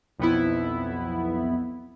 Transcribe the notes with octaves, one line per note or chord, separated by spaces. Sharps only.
B1 F2 B3 E4